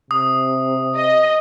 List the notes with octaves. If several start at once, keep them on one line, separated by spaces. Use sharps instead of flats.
C3 D#6
D#5